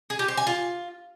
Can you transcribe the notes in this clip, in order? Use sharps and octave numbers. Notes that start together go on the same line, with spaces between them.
G#4
G4
C5
G#5
F4